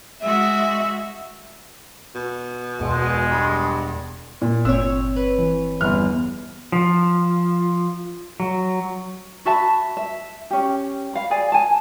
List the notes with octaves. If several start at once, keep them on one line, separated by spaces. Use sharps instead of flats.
G#3 F#4 E5
B2
E1 G#3
G2
A#2
G1 C4 C#5 E6
B4
E3
G1 E2 F6
F3
F#3
F#4 E5 A5 B5
E5
C#4 G4
F5 B5
G#4 D5 G#5
G#5 A5